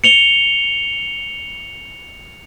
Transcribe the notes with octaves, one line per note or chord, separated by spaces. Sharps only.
C#7 F7 G7